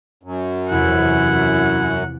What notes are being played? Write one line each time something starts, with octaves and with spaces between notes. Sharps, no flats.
F#2
E2 C3 F3 E4 F#5